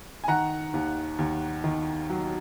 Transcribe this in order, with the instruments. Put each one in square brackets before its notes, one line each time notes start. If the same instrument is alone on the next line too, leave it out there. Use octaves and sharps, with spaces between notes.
[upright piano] G#5
D#3 F#5 A#5
D#2
D#2
D#3
F#3